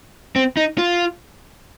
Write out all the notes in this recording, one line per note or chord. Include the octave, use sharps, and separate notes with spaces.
C4
D#4
F4